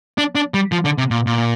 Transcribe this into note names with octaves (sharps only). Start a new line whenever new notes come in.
D4
D4
G3
F3
D3
C3
A#2
A#2